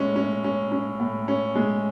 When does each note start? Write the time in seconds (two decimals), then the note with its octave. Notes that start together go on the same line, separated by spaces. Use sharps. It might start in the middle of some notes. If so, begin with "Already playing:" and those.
Already playing: A2 G#3 C#4
0.16 C#4
0.44 C#4
0.72 C#4
1.00 A2
1.28 C#4
1.55 G#3